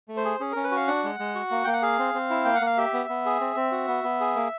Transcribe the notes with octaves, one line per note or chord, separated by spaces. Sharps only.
A3
C5
G#4
C#4 G#4
C#4 A#4
B4
F#4
F5
D4 F#5
G#3
G#3
F#4
A#3
A#3 G5
F#5
G#4 F5
C4
C4
E4
A#3 G5
F#5
A#3 F5
G4 E5
B3
B3
G#4
C4
C4
F#4
B3
B3
G#4
A#3